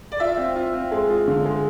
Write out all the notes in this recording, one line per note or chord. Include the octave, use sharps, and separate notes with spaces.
D5
F4 E5
C4
F4
C4
G#3
F4
D3
G#3